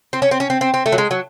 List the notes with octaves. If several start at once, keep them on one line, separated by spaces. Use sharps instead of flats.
C4
C#4
C4
C#4
C4
C4
C4
A3
F#3
G#3
F#3